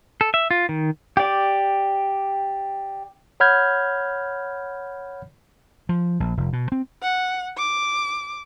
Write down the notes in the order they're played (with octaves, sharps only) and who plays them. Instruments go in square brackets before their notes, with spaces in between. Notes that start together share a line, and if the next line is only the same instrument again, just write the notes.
[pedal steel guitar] A4
E5
F4
D#3
G4 D5
[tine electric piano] C#5 F#5 B5 F6 G6 G#6
[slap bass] F3
A#1
F1
B2
C4
[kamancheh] F#5
D6